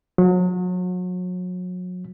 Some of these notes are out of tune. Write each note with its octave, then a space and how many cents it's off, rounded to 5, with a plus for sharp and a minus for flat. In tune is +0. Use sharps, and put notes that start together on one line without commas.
F#3 -35